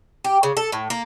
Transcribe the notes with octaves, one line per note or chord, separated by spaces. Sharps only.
G4
C#3
A4
A2
A#3